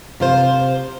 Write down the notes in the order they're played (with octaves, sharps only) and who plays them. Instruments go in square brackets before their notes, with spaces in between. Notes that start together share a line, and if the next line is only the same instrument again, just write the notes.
[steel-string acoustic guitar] C3 F4 C5